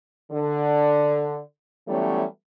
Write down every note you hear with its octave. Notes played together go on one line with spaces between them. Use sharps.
D3
E3 F#3 G3 A3 B3 C#4